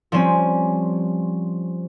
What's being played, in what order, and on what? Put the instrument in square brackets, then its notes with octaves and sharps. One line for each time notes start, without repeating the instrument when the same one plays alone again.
[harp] F3 G3 C4 C#4